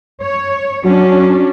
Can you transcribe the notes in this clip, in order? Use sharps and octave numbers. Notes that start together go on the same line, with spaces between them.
C#5
F#3 C#4 D4